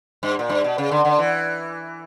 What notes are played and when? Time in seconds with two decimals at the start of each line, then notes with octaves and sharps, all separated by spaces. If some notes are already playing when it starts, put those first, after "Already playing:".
0.23 G2
0.39 A#2
0.49 G2
0.64 B2
0.78 C#3
0.91 D3
1.05 D3
1.19 E3